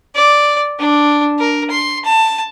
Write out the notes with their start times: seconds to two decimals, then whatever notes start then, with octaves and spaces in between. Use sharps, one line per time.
0.16 D5
0.79 D4
1.39 A#4
1.70 C6
2.05 A5